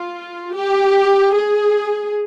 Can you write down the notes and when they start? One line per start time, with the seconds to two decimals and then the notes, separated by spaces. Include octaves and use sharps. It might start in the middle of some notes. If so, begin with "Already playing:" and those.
Already playing: F4
0.54 G4
1.34 G#4